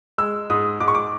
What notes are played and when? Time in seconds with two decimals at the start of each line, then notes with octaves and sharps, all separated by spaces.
0.18 G#3 E6
0.50 G#2 D#6
0.80 G#2 D6
0.88 C#6
0.95 D6